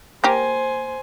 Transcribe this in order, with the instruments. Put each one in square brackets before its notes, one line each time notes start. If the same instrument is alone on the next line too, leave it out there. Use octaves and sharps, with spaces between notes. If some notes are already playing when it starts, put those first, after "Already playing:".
[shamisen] A#3 G4 A#4 [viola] C5 G#5